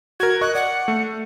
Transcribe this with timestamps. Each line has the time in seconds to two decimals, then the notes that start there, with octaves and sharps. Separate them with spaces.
0.20 F#4 A#4 G#6
0.41 D#5 C#6 F#6
0.55 D5 F#5
0.88 A3